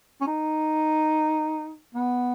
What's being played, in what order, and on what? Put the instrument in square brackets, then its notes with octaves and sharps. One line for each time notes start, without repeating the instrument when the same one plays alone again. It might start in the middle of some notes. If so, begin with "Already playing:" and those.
[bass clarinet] C#4
D#4
B3